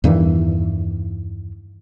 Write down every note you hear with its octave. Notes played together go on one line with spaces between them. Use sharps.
E2 G2 D#3 E3